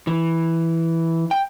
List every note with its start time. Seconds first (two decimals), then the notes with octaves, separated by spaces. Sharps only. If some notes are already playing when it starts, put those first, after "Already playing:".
0.07 E3
1.31 G5